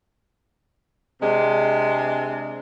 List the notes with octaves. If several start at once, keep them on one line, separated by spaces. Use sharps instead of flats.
C3 G#3 D4